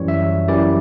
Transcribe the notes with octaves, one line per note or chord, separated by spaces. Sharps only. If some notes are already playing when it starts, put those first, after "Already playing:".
Already playing: F#2 E3 G3 C#5
E5
F#2 E3 G3 D5